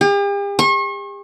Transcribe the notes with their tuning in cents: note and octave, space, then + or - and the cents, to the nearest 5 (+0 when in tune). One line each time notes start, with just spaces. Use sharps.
G4 +45
C#6 -40